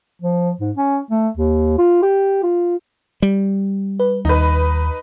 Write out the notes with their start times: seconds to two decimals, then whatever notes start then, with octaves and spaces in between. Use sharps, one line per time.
0.22 F3
0.61 G#2
0.77 C#4
1.11 A3
1.37 D#2
1.78 F4
2.02 G4
2.43 F4
3.22 G3
4.00 B4
4.25 D#2 D#4 B4